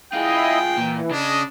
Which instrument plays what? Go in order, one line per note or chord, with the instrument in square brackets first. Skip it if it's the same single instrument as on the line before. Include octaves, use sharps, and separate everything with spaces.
[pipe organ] E4 D#5 [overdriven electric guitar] F4 G#4 [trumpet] G5
[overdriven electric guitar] A#2 [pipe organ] E3
[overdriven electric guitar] C#3 [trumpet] D4 [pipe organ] D#5